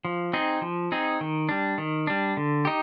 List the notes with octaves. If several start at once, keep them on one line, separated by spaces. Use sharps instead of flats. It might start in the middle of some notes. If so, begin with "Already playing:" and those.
F3
C4 D#4 G#4
F3
C4 D#4 G#4
D#3
G3 D4
D#3
G3 D4
D3
D#4 G4